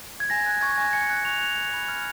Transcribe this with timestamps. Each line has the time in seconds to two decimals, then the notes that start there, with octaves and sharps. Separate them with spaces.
0.20 G#6
0.30 G#5 A#6
0.46 F#6
0.61 C#6 G#6
0.77 G#5 A#6
0.93 G#5 C#7
1.10 F#6
1.25 C#6 F7
1.41 G#5
1.58 B5
1.74 B5
1.88 F6